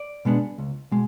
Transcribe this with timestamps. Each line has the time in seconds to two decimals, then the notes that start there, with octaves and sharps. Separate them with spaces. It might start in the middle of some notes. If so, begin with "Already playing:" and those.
Already playing: D5
0.25 B2 G#3 B3 D4
0.58 C#2
0.91 B2 G#3